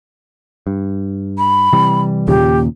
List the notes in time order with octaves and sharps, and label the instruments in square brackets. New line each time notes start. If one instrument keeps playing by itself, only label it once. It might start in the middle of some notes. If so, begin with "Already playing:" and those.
[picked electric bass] G2
[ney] B5
[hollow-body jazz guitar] C3 E3 G3
[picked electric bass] D#2 A#2 C#3 [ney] G4